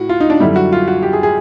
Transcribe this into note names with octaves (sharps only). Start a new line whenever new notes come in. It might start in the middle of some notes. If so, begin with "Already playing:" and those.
Already playing: A2 F#4
F4
D#4
D4
F#2 D3 G3 E4
F#4
F4
F#4
G4
G#4
G#4